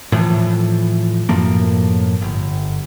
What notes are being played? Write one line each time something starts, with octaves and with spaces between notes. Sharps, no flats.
A2 E3 F3
F#2 A2 F3 A#3
G1